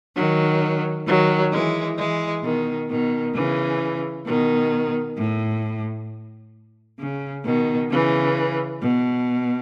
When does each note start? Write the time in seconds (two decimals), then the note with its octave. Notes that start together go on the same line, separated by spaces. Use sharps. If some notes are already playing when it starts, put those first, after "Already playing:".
0.16 D#3 F#3
1.07 D#3 F#3
1.52 E3 G#3
1.98 E3 G#3
2.43 B2 D#3
2.89 B2 D#3
3.35 C#3 E3
4.26 B2 D#3
5.17 A2
6.99 C#3
7.45 B2 D#3
7.90 C#3 E3
8.81 B2